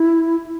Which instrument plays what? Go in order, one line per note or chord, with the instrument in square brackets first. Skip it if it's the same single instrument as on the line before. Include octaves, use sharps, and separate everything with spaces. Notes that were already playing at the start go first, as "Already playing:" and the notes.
Already playing: [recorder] E4